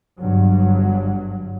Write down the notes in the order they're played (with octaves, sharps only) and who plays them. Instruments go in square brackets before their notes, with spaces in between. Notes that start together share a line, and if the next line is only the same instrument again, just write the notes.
[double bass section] G1 G2 F#3